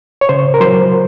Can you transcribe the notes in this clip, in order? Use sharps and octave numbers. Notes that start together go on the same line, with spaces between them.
C#5
C#3 C5
A#4
F#3 C5